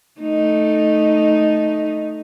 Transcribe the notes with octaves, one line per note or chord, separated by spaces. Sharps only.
A3 D#4